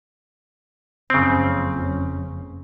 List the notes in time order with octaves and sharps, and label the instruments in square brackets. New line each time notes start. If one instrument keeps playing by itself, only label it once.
[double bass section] F#1 F2 C#4 [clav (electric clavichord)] C#3 C4